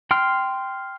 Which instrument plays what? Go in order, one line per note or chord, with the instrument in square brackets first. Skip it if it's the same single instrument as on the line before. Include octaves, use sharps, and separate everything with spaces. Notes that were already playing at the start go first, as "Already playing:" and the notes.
[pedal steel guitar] G5 C6 F6